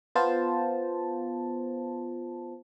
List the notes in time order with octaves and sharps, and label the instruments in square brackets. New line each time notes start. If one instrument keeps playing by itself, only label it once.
[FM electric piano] B3 F4 C5 A5